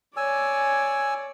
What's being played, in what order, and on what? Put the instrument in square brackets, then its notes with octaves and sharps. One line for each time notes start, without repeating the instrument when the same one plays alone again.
[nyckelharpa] C#5 D5 [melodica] G#5 E6